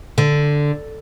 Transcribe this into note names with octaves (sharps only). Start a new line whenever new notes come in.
D3